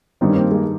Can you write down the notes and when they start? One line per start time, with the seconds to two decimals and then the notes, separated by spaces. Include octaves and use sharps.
0.21 G2 D#3 G3 C4 D4
0.29 C#4
0.36 A#3 C4
0.51 G#3 A#3